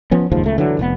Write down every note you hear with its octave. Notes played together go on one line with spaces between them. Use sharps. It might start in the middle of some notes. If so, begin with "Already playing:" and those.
F3 B3 C#4
F#1 D#2 G#2 F3
C#2 A3
D3 E3 F#3
F1 A2 B3